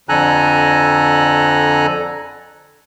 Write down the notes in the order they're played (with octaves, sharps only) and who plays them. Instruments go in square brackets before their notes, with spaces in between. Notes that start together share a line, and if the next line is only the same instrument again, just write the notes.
[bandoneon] F2 D3 A4 G#5 A#5 F#6